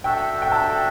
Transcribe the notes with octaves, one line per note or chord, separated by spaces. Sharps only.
D4 F#4 A4 E5 G5
G5
D4 F#4 A4 E5 A5